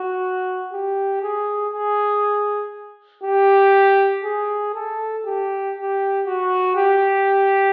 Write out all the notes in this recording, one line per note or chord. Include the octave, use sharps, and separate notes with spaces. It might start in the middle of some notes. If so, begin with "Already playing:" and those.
Already playing: F#4
G4
G#4
G#4
G4
G#4
A4
G4
G4
F#4
G4